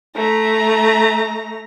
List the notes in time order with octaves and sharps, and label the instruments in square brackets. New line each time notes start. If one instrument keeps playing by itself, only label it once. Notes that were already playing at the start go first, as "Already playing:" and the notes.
[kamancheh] A3 A#5